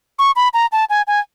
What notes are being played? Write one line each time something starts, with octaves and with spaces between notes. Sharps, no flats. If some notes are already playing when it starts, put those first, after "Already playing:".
C#6
B5
A#5
A5
G#5
G#5